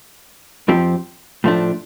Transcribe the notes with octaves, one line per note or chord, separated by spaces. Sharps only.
F2 F3 C4 G4
A2 F3 A3 D4